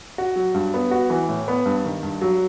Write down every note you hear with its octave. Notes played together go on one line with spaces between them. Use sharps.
F#4
F#3
G2
B3
F#4
E3
A2
B3
G2
D#3
G2
F#3